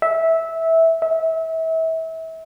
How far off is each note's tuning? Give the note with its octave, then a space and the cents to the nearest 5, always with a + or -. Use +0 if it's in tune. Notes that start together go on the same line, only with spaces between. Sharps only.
E5 -15
E5 -30